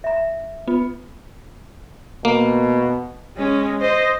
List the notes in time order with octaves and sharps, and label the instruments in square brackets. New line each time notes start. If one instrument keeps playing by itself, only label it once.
[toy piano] E5 A#5
[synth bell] B3 [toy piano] F4
[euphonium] B2 [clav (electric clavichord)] A#3
[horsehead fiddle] G#3 C#4
C5 D#5